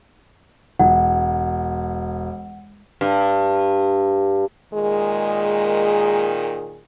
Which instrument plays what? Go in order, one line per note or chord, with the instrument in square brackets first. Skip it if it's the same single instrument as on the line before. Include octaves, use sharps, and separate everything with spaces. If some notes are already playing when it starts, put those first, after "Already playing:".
[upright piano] E1 [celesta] F#5
[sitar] G2
[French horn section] A#2 D#3 G#4 [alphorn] G#3